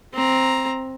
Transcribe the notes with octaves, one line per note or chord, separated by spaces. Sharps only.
C4 A#5